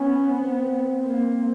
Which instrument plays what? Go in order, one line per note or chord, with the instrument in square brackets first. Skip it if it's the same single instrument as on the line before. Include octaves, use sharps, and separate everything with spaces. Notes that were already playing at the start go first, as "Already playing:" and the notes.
Already playing: [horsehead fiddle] B3 [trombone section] C#4
[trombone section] C4
[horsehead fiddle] A#3